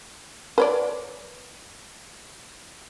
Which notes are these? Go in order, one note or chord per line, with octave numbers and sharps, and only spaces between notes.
B4 C#5 D5